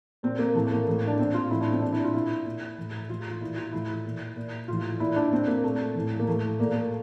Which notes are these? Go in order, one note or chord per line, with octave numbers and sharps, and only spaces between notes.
A#2 C4
A#3
A2 E3 A3
A#3
A2 E3
D4
A#2 C4
F4
A2 E3 E4
D4
C4
A#2 D4
E4
F4
A#2 E4
A#2
A2 E3
A2 E3 F4
F4
A#2 E4
F4
A2 E3 E4
A#2
A#2
A2 E3 F4
A#2 E4
D4
A#2 C4
A#3
A#2 A3
A2 E3
A#3
A2 E3 A3
A#2 A#3
A#3
A3